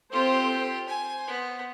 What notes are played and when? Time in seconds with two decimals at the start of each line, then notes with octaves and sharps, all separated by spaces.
0.12 C4 F4 G4 A4 C5
0.89 C5 G#5
1.27 B3